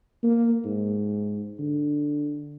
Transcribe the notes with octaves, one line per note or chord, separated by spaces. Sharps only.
A#3
G#2
D3